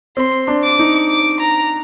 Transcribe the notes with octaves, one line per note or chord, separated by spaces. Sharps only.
C4 C6
D4
D6
D#4
D6
A#5